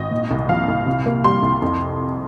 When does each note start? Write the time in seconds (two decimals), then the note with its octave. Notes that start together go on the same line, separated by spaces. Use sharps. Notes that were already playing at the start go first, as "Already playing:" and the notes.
Already playing: G#1 D#5
0.11 A#2
0.31 C2
0.49 F3 F5
0.68 C2
0.86 C3
1.06 A#3
1.24 G3 C6
1.43 C2
1.62 F2